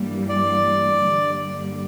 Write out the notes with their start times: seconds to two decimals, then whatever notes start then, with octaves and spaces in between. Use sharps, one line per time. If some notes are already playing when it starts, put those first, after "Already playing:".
Already playing: G2 E3 G3 A#3
0.29 D5
1.01 G2 D3 G3 A#3